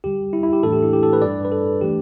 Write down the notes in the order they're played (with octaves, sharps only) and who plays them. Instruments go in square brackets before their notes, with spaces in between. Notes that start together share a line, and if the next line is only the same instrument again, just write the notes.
[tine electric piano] E2 D3 G3 G4
E4
E4
G4
A2 E3 A3 D4 A4
G4
E4
G4
A4
B4
G2 G3 D4 D5
B4
A4
E3 A3 D4 G4